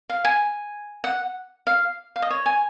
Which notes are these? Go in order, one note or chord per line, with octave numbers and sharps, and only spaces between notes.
F5
G#5
F#5
F5
F5
D#5
C#5
G#5